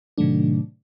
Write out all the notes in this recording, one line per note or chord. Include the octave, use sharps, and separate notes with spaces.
A2 C3 D#3 F#3 A3 D4